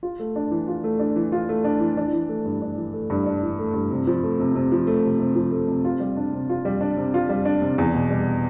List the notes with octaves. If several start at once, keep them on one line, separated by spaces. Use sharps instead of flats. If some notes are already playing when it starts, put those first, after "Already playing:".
F4
A3
D4
E3
F4
A3
D4
E3
F4
A3
D4
E3
D4
E3
A3
G2
D4
E3
A3
G2
D4
E3
A3
G2
C3
F3
A3
C3
C3
F3
A3
C3
C3
F3
A3
C3
F4
G3
D4
C3
F4
G3
D4
C3
F4
G3
D4
C3
E2
B2
G3